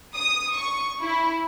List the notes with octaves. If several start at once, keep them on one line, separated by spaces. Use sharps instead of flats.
D#6
C#6
E4